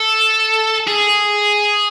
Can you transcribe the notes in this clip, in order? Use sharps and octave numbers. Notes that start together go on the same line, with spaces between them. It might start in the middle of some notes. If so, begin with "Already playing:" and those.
Already playing: A4
G#4